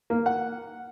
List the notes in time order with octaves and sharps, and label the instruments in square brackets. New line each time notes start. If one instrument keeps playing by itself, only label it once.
[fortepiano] A#3
F#5